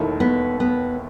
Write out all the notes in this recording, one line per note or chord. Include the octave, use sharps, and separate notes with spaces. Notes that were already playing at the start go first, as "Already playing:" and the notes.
Already playing: E1 D#2 D#3 A3 E4
B3
B3